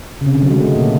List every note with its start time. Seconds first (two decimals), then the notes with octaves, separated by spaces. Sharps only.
0.21 C#3
0.26 C3
0.34 D3
0.42 F#3
0.51 G#3
0.60 A3
0.76 A#2 A#3